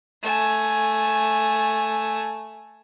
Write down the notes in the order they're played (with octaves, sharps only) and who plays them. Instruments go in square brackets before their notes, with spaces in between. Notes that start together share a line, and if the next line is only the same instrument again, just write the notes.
[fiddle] A3 G#5